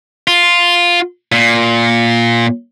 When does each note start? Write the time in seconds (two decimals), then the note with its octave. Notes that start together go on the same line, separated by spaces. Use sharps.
0.28 F4
1.32 A#2